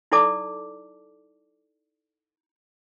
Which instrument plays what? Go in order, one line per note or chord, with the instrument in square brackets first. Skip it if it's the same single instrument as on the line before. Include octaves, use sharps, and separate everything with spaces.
[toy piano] D#4 E4 A4 D5 A5 D6